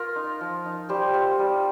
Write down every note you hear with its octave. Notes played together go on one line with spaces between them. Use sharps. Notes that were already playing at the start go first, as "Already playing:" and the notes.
Already playing: F4 A#4
D#4
F3
D#4
G3 G4 C5
C4 F4
G3